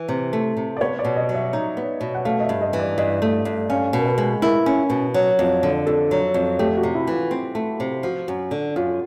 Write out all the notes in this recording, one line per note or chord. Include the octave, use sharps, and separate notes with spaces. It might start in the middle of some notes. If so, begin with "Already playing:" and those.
Already playing: E3
C3
A3
C3
D5
B3 C#5
D5
B2
D#5
F#3
E5
D#4
B3
B2
F#5
A3 F5
D#5
E5
G2
D#5
E3
D5
G2 D#5
A3
G2
C#4 F5
B2 A#4
B4
G#3
E4 A#4
C#4
B2
F#3
F2
D3
F2 A4
F#3
F2
A3 G4
F#4
C3
E4
E3
F4
C4
A3
C3
F3 F#4
F#2
D3
F#2 F4